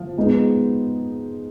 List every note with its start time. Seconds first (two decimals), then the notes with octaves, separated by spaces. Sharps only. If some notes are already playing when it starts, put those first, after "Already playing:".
Already playing: F3
0.17 G#3 B3 D#4